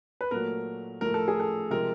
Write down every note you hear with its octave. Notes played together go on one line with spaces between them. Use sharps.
B4
A#2 F#3 A3 A#4
A2 F3 A3 A#4
A4
G#4
A4
C3 F3 G#3 A#4